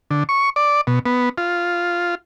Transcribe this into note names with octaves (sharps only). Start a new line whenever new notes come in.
D3
C#6
D5
B2
B3
F4